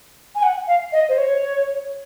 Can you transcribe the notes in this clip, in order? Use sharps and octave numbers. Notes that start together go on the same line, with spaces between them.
G#5
F#5
F5
D#5
C5
C#5